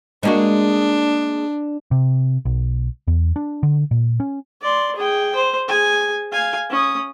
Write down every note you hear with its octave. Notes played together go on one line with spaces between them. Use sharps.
G#3 A#3 D4 F#4
C3
B1
E2
D4
D3
A#2
C#4
D5 C6
G#4 G5
C5
G#4 G#5
F5 G#5
C#4 D#6